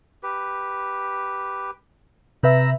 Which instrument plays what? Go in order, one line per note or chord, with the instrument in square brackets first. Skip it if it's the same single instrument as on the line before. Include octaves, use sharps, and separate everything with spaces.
[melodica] G4 B4
[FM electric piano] C3 B4 E5 [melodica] A#5 B5 E6